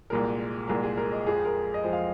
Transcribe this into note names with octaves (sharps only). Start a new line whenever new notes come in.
C2 A#2 G#3 A#4
C2 A#2 G#3 A#4
G#4
A#4
D#5
F2 F3 G#3 G#4
A#4
D#5
F2 F3 G#3 C5
F5